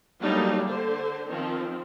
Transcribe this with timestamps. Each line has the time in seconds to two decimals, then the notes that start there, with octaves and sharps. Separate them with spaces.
0.21 F#3 G3 A3 A#3 D4 D#4
0.68 D3 C5
1.28 D#3 F3 C4